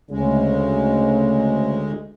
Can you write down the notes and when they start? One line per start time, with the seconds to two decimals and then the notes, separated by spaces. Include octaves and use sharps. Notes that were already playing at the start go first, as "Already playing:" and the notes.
0.11 D2 C#3 G#3